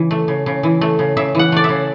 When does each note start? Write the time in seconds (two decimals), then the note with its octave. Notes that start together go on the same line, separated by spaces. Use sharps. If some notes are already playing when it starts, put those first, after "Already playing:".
Already playing: C#3 E3
0.11 A3
0.28 C#3
0.46 C#3
0.63 E3
0.81 A3
0.99 C#3
1.17 C#3 E5
1.35 E3 F#5
1.52 A3 D5
1.64 E5
1.69 C#3